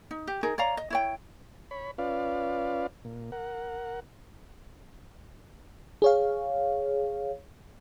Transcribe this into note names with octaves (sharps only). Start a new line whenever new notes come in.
D#4
G4
D#4 G#4 A#4
C#5 D5 F5 A#5
D#5
E4 C#5 G5
C#5 B5
C#4 F4 B4 D5 F5
A#2
A#4 F#5
G#4 C#5 F5